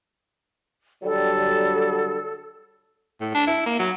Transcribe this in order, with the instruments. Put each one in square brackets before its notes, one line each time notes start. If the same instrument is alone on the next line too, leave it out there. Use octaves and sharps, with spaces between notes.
[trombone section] D3 F#3 G3 [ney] A4
[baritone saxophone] A2
D4
E4
A#3
F#3